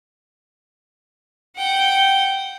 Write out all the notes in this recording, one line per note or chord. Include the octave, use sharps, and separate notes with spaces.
F#5 G5